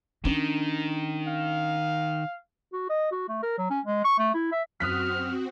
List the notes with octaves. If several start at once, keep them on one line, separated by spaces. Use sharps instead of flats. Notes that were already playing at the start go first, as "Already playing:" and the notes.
D#3 C#4 D4
F5
F#4
D#5
F#4
A3
A#4
F#3
C#4
G#3
C#6
A3
E4
E5
F#2 C4 F#4 D#6 F6 F#6 B6